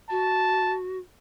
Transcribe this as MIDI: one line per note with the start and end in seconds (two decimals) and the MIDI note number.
0.10 0.98 66
0.10 0.76 81